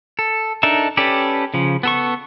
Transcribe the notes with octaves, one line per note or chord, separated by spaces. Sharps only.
A4
D4 D#4 A4 A#4 E5
C#4 G4 A4 B4 D5
C#3 F3
B3 A4 C#6